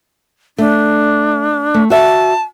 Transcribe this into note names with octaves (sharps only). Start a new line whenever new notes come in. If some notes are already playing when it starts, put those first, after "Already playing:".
A3 D4
A3
F#4 E5 A5